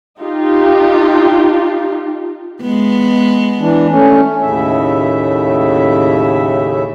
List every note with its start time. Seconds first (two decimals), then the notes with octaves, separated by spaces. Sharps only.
0.20 D#4 F4 G4
2.61 G#3 B3
3.60 E3 D4
3.90 A3 C#4
4.41 D#2 A2 C#3 E5